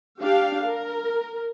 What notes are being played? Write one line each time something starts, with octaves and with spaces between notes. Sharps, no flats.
D4 G4 F5
A#4